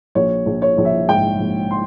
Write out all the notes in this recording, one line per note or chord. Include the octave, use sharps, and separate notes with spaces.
A#1 C#5
A#1
C#5
A#1
E5
G#2 G5
A#1
C6